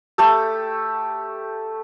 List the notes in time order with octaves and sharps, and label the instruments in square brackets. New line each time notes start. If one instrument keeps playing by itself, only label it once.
[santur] A3 G4 A4